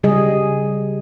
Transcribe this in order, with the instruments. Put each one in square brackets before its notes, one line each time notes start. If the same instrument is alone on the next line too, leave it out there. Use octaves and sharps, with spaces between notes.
[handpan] C#3 G3 G#4 D#5